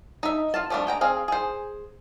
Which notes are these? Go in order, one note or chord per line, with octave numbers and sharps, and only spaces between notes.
D#4 E5
F4 F5 A5
F3 G3 A3 C4 D4
G#3 G5 A#5
C4 G#4 F5
G#4 C5